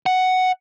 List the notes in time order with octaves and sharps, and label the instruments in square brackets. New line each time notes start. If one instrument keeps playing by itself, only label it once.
[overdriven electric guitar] F#5